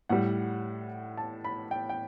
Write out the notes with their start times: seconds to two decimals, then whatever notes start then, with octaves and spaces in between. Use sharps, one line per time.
0.09 A2 G3 F#5
1.17 A5
1.44 B5
1.71 G5
1.89 G5